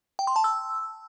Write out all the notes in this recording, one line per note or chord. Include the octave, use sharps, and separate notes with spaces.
G5
C6
A5
E6